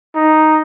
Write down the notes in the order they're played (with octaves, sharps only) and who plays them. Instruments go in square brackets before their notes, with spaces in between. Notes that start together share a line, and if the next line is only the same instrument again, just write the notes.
[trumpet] D#4